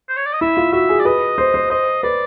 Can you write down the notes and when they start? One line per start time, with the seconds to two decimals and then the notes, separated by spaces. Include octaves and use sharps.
0.09 C5
0.16 C#5
0.25 D5
0.33 D#5
0.41 E4 E5
0.57 F4
0.72 F#4 E5
0.89 G#4
1.00 D5
1.05 B4 D#5
1.38 C5
1.54 C5
1.70 C5 D#5
2.03 B4 D5